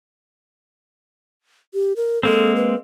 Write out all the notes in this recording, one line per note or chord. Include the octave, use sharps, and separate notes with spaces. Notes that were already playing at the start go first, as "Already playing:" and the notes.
G4
A#4
G#3 A#3 C4 A4
B4